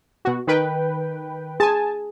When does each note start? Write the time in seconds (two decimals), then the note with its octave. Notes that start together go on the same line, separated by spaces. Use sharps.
0.25 B2 F#4
0.47 D#3 B4 G5
1.60 G#4 G#5 A5